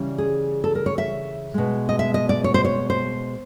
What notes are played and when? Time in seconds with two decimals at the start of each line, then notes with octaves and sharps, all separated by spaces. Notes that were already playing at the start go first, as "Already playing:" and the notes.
Already playing: C#3 E3 G3
0.18 G#4
0.64 A4
0.75 A#4
0.86 C#5
0.98 E5
1.54 B2 G#3
1.89 D#5
1.99 E5
2.14 D#5
2.29 D5
2.44 C#5
2.54 C5
2.65 C#5
2.90 C5